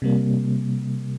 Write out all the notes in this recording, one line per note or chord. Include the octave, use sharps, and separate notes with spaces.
C3 G3 A#3